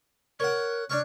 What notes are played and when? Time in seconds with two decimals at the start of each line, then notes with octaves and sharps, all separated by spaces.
0.40 A#4 C#5 F#5
0.90 D4 C#5 C#6 F6